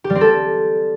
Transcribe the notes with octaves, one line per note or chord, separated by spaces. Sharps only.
G4
G3
C4
A4